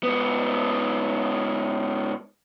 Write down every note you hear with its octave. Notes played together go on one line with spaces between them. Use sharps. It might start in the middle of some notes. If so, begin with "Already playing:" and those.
G#2 B3